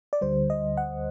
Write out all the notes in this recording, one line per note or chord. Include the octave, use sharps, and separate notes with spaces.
D5
D2 D3 G3 C5
D#5
F#5